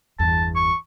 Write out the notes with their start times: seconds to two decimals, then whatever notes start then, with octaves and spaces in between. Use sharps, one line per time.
0.19 G1 E2 A5
0.56 C#6